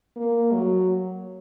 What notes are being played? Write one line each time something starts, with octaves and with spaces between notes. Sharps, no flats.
A#3
F#3